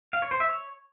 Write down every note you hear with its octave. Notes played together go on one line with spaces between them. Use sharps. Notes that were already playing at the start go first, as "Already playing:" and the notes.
F5
C#5
C5
E5
C#5